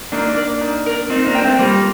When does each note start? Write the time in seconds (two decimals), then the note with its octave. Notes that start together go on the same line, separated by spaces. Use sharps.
0.12 A#3 D4 D#4
0.36 A#4 D5
0.61 D#4
0.86 A#4 D5
1.10 C4 D#4 F4
1.26 A#3 D4
1.35 C5 G5
1.43 A3 C4
1.59 G3 A#3 F4